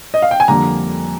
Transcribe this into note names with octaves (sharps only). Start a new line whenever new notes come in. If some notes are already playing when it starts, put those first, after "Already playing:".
D#5
F5
G5
G#5
F2 D3 G3 A#3 A#5